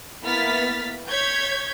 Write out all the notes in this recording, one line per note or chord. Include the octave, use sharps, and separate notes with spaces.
A#3 B3 E4 F6 A6 B6
C#5 G6 G#6 B6